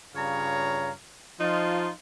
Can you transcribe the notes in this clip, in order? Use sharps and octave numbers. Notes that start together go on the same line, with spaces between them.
G2 C#3 F4 C#5 F5 A#5
F3 D#4 F4